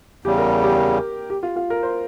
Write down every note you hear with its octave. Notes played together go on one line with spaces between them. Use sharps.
E2 C#3 G3 G4
A#4
G4
A#4
G4
F4
F4
A#4
C5